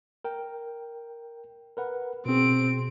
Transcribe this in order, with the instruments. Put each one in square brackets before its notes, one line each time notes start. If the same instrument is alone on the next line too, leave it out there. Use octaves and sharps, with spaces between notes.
[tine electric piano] A#4 G5
A#4 B4 F#5
[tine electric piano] B2 G#4 [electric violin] C4 D7